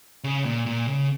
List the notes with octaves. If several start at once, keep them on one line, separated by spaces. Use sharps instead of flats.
C#3
A#2
A#2
C#3